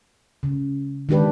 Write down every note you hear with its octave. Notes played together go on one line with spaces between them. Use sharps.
C#3
D#3 G#3 D4 G4 B4